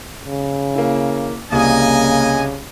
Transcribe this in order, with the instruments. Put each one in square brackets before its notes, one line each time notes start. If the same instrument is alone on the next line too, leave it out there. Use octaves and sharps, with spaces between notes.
[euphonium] C#3
[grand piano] A#3 E4
[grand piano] C2 D#6 [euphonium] C#3 [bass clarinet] A#3 [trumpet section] D#5 G#5